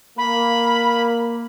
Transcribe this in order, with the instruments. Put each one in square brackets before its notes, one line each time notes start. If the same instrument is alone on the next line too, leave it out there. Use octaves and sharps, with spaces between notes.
[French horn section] A#3 [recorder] B5